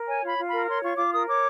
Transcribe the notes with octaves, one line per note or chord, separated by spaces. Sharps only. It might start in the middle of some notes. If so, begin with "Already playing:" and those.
Already playing: A#4
C#5 G#5
F4 B5
F4
A#4 B5
C#5 C6
F4 C#6
F4 D6
A#4 D#6
C#5 D6